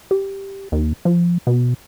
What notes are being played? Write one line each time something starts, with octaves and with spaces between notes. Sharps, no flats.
G4
D#2
F3
B2